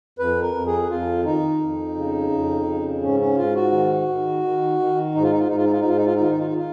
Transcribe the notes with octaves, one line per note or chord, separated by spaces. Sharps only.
F2 B4
A#4
F2
G#4
F2 F4
D#3 D#4
F2
C#3
F2
C#3
G#2 C#4
C#4
G#2 F4
F#4
D#3
D#3
D#3
D#3
G#2 D#4
F4
D#4
F4
G#2 D#4
F4
D#4
F4
D#4
G#2 F4
D#4
F4
D#4
D#3 F4
D#4
F4
D#4
F4